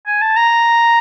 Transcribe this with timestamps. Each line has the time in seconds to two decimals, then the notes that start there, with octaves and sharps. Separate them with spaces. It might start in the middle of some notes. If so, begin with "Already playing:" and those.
0.07 G#5
0.21 A5
0.37 A#5